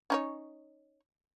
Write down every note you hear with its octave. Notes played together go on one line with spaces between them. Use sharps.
C#4 D#4 C#5